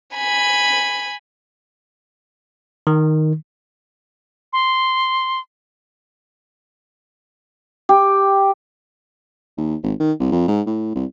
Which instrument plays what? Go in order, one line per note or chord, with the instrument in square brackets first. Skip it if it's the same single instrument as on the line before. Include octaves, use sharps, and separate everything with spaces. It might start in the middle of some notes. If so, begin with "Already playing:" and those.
[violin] G#5 B5
[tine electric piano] D#3
[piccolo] C6
[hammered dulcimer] G4
[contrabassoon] D#2
G#1
D#3
C2
F2
G#2
A2
C2